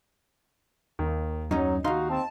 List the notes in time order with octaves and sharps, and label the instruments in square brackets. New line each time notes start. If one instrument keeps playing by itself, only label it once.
[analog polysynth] D#2 [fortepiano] D#3
[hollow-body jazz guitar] F#2 C#4 [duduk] F#3 [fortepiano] D#4
[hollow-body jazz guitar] D#2 C6 [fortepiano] D#4 F5 [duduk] F#4
[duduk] C4 [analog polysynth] A5